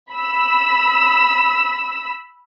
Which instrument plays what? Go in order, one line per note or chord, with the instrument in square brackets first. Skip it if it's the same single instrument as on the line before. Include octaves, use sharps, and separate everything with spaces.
[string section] B5 E6